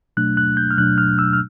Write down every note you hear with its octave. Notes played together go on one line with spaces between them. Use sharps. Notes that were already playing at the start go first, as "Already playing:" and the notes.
B2 F#3 A3 D4 F#6
F#6
G6
F6
B2 F#3 A3 D4 F#6
F6
E6
F6